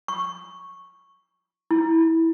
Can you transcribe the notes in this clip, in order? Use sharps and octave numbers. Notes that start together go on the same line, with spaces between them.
C#6
E4